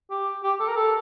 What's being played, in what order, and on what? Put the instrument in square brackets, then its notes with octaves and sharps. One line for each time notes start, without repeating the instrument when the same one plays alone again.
[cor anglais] G4
G4
A4
A#4
A4